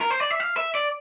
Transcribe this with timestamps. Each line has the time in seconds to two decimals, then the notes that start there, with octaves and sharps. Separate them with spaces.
0.01 A#4
0.10 C5
0.20 D5
0.31 E5
0.40 F5
0.57 E5
0.75 D5